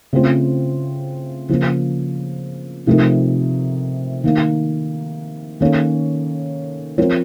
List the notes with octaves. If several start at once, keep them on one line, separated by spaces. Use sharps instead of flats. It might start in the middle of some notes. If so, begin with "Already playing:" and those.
C#3 A3 C4 F4 C5
C#3 F3 A#3
C3 F3 A3 D#4 A#4
D#3 A#3 D#4
D#3 A#3 C#4 A4 C#5
F3 C4 F4 A#4 C#5